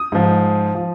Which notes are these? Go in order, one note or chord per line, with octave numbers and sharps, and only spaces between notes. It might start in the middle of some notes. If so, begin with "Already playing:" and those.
Already playing: D#6
G#2 F3
F3